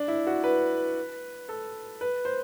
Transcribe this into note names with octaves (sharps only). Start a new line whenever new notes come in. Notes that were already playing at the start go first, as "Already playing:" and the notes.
Already playing: D4
E4
F#4
B4
A4
B4
C5